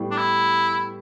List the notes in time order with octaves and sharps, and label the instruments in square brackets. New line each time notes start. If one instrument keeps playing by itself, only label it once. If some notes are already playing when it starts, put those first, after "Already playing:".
Already playing: [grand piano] A2 G3 B3
[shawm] D4
E4